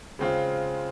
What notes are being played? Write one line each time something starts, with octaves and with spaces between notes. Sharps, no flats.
C#3 G#3 C4 F4